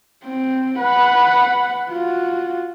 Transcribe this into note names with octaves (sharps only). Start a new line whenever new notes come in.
C4
B4 F#5
F4 F#4